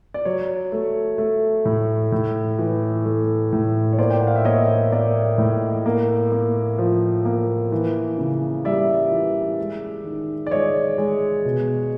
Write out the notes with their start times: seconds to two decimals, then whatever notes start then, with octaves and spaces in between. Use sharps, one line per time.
0.14 D5
0.25 F#3 C#5
0.72 A3
1.18 A3
1.65 A2
2.12 A2
2.59 E3
3.05 A3
3.53 A2
3.93 C#5
3.98 A#3 C5 D5
4.10 G5
4.19 F#5
4.27 F5
4.36 E5
4.45 A#3 C#5 D#5
4.92 A#3 D5 E5
5.38 A2
5.86 A#3
6.32 A#3
6.78 F3
7.25 A#3
7.72 E3
8.18 C#3
8.65 G3 D5 E5
9.11 E3
9.59 G#3
10.04 D#3
10.47 D5
10.51 G#3 C#5 D#5
10.98 G#3
11.45 B2